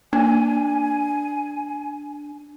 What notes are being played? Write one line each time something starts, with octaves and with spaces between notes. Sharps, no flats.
A#3 D4 G#5